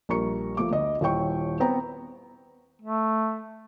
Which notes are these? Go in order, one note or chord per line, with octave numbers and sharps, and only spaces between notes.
A#1 G3 A#4 A#5 C#6 C#7
F3 A3 D6
D2 D#5
D#1 E4 C#5 G5 C#6
B3 C4 G5 A#5
A3